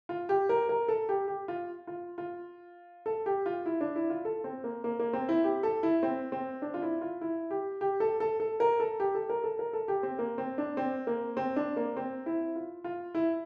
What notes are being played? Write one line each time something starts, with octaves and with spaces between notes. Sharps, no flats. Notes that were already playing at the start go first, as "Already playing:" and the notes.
F4
G4
A#4
A#4
A4
G4
G4
F4
F4
F4
A4
G4
F4
E4
D4
E4
F4
A4
C4
A#3
A#3
A#3
C4
E4
G4
A4
E4
C4
C4
D4
F4
E4
F4
E4
G4
G4
A4
A4
A4
A#4
A4
G4
A4
A#4
A4
A#4
A4
G4
C4
A#3
C4
D4
C4
A#3
C4
D4
A#3
C4
E4
F4
F4
E4